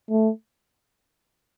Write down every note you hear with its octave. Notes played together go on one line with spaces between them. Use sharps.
A3